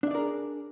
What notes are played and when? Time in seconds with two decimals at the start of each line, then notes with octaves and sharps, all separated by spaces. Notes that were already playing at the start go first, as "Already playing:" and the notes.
0.03 D4
0.07 E5
0.11 D5
0.15 A#4
0.18 G#4